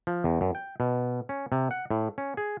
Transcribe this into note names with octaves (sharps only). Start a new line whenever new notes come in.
F3
E2
F#2
G5
B2
C#4
C3
F#5
A2
C#4
G#4